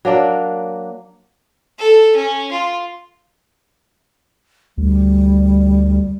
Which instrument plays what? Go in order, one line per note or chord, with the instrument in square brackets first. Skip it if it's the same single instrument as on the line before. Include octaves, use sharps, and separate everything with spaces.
[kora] F#3 A#3 D4 D5
[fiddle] A4
C#4
F4
[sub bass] D2 [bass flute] G3